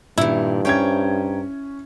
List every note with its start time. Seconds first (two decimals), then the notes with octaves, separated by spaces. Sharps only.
0.18 G2 A#2 D#3 E4
0.65 C#4 C5 G5 A#5 G#6